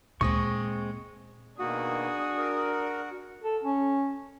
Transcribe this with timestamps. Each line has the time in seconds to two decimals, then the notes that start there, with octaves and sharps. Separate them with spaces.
0.21 D2 A#2 G#3 C4 C#6 D#6
1.59 B2 D#3 A#3 D4 F#4 G#4 D#6
2.38 A#4
3.43 A4
3.63 C#4